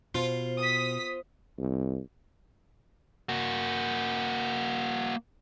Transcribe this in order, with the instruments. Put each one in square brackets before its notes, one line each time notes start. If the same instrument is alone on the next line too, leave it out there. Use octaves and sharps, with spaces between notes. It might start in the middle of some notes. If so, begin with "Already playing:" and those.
[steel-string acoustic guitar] B2 [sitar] F4 [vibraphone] C5
[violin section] D#6 B6
[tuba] C2
[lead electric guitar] A#3 F#4